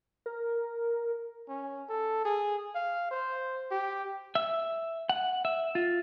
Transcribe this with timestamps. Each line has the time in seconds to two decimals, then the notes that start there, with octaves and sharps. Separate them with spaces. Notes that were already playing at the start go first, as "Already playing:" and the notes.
0.26 A#4
1.48 C#4
1.89 A4
2.25 G#4
2.75 F5
3.11 C5
3.71 G4
4.35 E5
5.09 F#5
5.45 E5
5.75 F4